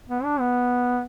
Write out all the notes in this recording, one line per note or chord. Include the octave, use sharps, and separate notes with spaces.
B3
D4
B3